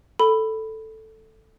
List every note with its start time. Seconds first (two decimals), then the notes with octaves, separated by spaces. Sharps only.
0.19 A4 B5